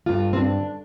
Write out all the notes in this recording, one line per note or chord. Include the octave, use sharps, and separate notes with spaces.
G2 D3 F4
C4
D4